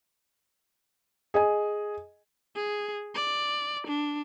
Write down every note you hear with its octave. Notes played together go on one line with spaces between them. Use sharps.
G#4 D#5 G#5
G#4
D5
D4